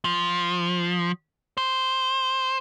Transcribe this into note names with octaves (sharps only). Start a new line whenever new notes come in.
F3
C5